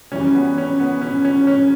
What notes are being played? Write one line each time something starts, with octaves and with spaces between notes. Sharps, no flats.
F#2 E3 G3 C#4
B3
C#4
B3
C#4
C#4
C#4